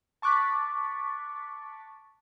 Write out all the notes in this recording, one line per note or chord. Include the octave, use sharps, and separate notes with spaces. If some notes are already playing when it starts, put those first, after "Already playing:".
A5 C#6 D6 F#6 A6 B6